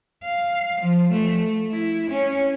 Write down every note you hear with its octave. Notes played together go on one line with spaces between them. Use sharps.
F5
F3
A3
E4
C#4